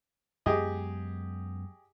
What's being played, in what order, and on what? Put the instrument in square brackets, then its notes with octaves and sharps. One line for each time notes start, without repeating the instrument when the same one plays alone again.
[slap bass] F#2 G#3 B3 [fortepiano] G4 G#4 D#5